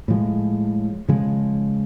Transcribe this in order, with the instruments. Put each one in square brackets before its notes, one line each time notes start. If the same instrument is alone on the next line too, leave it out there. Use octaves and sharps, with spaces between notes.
[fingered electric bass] A2 F3 G#3
C#3 F3 G#3